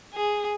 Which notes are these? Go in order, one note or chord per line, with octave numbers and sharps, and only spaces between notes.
G#4